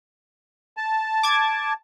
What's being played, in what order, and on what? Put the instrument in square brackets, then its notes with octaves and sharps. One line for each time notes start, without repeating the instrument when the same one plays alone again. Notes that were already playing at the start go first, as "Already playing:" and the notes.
[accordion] A5
[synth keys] D6 G#6